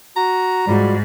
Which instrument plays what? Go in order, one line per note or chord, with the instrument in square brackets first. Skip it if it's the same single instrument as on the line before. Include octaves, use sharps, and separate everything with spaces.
[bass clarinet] F#4 [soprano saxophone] A#5
[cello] G#2 [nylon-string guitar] F3 F#4 [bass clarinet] G3